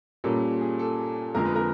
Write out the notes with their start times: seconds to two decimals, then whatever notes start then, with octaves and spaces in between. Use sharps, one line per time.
0.24 A#2 G3 A#3 C#4 A4
0.61 G#4
0.79 A4
1.35 F2 D3 F3 G#3 A#4
1.45 B4
1.56 A#4